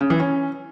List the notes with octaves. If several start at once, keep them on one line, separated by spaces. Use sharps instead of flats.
C#3
E3
C#4